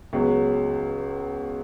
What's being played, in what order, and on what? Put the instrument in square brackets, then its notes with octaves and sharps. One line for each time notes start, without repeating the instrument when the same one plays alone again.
[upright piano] C#2 C#3 F#3 B3